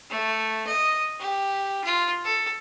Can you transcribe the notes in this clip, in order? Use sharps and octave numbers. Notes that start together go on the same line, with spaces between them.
A3
D#5
G4
F4
A4